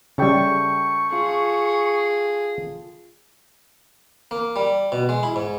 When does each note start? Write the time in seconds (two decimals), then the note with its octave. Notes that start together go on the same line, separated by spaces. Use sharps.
0.18 C#3 G3 A4 E5 G5 C#6
1.12 F4 G#4
4.31 A#3
4.56 G3
4.92 B2
5.09 G#3
5.23 E4
5.36 G#2